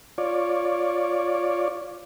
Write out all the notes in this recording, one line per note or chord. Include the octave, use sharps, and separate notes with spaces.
F4 C#5 D5